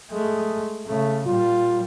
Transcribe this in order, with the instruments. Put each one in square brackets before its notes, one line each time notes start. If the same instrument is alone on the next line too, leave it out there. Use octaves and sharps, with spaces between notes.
[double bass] G#3 A3
C#3 A3
[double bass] A#2 G3 [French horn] F4